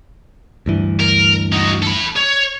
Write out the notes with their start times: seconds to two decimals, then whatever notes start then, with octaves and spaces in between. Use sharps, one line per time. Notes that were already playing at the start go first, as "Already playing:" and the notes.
0.66 D2 G2 E3
1.00 A#4
1.53 D#4 F#4
1.82 A4 B5
2.16 C#5